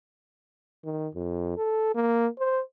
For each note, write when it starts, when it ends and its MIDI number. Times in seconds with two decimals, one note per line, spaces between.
0.85 1.08 51
1.14 1.54 41
1.57 1.91 69
1.95 2.27 58
2.39 2.61 72